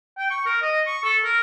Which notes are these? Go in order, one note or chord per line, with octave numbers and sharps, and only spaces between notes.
G5
C#6
A#4
D#5
C#6
A4
A#4